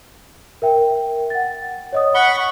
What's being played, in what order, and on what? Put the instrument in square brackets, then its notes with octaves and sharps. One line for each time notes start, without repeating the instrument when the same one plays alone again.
[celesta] A#4 E5 G5
F#5 A6
C#5 D#5 D#6
[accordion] F#5 B5 C#6 [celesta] G7